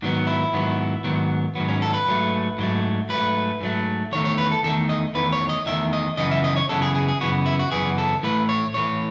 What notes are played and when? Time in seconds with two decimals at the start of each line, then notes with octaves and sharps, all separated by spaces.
0.02 G#2 D#3 F#3 B3
0.27 E4
0.53 G#2 D#3 F#3 B3
1.04 G#2 D#3 F#3 B3
1.55 G#2 D#3 F#3 B3
1.69 C#4
1.82 A4
1.94 B4
2.07 G#2 F#3 A3
2.58 G#2 F#3 A3
3.09 G#2 F#3 A3 B4
3.61 G#2 F#3 A3
4.12 E2 D#3 A3 C#5
4.25 C#5
4.38 B4
4.52 A4
4.63 E2 D#3 A3 A4
4.89 D#5
5.15 E2 D#3 A3 B4
5.32 C#5
5.49 D#5
5.66 E2 D#3 A3 E5
5.93 D#5
6.17 F#2 C#3 E3 B3 D#5
6.31 E5
6.44 D#5
6.56 C#5
6.69 F#2 C#3 E3 B3 A4
6.82 G#4
6.95 G#4
7.08 G#4
7.21 F#2 C#3 E3 B3 F#4
7.46 E4
7.59 F#4
7.71 F#2 C#3 E3 B3 G#4
7.98 A4
8.23 A2 E3 A3 B4
8.49 C#5
8.74 A2 E3 A3 C#5